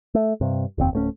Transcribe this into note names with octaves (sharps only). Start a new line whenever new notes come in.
A3
G2 C3
F1 D#2 C4
D1 A3 C#4